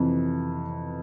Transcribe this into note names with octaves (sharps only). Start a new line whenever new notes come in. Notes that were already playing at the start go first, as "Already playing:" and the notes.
Already playing: F2 C3 E3